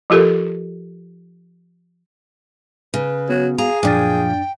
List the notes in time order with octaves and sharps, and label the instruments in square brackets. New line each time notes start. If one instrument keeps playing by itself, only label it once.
[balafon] F3 F4 G4 A4 A#4
[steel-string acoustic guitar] C#3 [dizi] B4
[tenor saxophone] F#3 [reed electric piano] B3 F#4
[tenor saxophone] G#4 [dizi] F5 [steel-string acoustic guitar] A#5
[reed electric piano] F#2 D4 A6 [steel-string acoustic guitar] A#2 F3 [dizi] G5